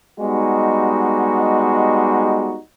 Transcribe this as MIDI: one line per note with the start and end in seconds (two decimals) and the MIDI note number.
0.20 2.56 55
0.20 2.56 56
0.20 2.56 59
0.20 2.56 63
0.20 2.56 66
0.20 2.56 67